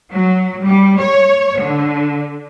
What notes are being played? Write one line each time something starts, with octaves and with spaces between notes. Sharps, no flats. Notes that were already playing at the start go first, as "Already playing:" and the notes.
F#3
G3
C#5
D3